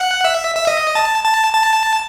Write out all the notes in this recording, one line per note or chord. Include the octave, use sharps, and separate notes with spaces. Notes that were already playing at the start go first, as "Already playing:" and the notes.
Already playing: F#5
E5
E5
D#5
A5
A5
A5